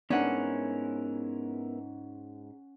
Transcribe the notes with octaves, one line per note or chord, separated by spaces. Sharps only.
G#2 B3 C#4 D4 E4 A#4 F#5